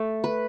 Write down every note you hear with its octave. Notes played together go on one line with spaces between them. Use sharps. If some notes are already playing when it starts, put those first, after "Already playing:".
Already playing: A3
B4